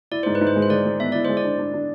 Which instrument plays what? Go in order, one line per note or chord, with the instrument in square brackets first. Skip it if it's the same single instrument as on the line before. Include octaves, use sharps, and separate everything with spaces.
[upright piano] E4 [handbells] D5
[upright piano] G#2 [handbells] C5
[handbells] B4
[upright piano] G#2
[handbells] C5
[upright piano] G#3
[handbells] C5
[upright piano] G#3 [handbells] D5
[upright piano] G#3
[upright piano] B3 [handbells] E5
[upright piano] E4 [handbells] D5
[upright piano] G#3 [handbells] C5
[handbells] D5
[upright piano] D4
D4
D4